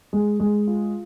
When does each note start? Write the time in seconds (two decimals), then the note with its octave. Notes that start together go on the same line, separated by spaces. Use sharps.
0.13 G#3
0.40 G#3
0.67 F4